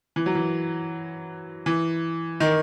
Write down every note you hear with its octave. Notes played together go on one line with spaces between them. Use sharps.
E3
F#3
E3
E3
D#3